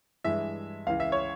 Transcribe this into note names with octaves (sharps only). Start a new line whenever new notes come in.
G2 E3 G#3 E5
C#2 C#3 E3 F5
E5
C#5